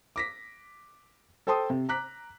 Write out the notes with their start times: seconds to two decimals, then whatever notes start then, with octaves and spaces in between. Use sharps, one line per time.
0.16 D6 A#6 B6
1.47 A4 C5 G5 A5 C6 D#6
1.70 C3
1.89 A#5 D6 F#6 B6